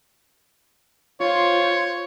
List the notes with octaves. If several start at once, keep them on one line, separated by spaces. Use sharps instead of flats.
F4 C5 C#5